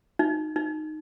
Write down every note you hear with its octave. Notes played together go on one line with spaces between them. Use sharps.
D#4
D#4